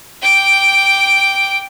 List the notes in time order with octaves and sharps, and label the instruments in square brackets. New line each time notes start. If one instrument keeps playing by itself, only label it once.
[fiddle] G5 D6